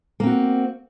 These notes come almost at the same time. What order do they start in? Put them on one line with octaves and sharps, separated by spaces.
A#3 C4 F#4